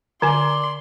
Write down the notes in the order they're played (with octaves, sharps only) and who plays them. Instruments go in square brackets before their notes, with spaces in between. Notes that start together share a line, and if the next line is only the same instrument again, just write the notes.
[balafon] D3 G#5 [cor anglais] D5 [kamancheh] C6